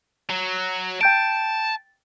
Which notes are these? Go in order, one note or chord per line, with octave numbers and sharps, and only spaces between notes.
F#3
G5 A5 G6 D7